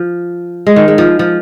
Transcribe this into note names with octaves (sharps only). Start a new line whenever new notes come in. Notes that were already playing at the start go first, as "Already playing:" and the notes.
Already playing: F3
G#3
D#3
G#3
F3
F3